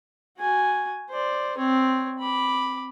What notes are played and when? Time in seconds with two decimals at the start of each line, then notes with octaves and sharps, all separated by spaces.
0.38 F#4 G#5
1.10 C5 D5
1.58 C4 C#5
2.19 B5 D6